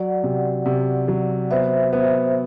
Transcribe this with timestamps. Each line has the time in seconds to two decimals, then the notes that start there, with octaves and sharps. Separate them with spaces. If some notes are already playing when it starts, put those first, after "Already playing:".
Already playing: F#3 D5 F#5
0.23 C3
0.66 C3
1.08 F#3
1.51 B3 C5 E5
1.93 B3 C5 E5